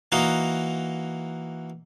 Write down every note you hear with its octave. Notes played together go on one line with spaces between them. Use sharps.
E3 A#3 D#4 F#4 D#5